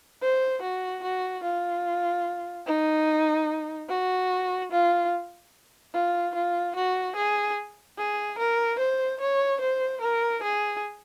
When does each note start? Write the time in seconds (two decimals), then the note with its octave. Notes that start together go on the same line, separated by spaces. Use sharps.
0.22 C5
0.62 F#4
1.04 F#4
1.44 F4
2.67 D#4
3.89 F#4
4.72 F4
5.94 F4
6.35 F4
6.76 F#4
7.16 G#4
7.98 G#4
8.39 A#4
8.79 C5
9.21 C#5
9.61 C5
10.01 A#4
10.43 G#4